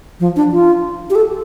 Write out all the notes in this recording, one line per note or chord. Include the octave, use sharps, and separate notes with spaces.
F3
D4
F4
G4
A4